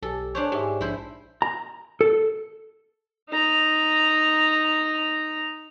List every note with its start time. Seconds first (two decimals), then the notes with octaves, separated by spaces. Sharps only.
0.02 B1 G4 A4
0.35 D4 C5 C#5
0.52 G#2 G4 E5
0.81 A#1 D4 E4 C5
1.42 A#5
2.01 A4
3.30 D#4 A#5